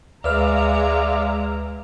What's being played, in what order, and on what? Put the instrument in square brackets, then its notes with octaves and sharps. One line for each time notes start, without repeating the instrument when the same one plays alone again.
[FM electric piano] D2 B4 F6 [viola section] G#3 A#5 [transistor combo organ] D5 E5 F5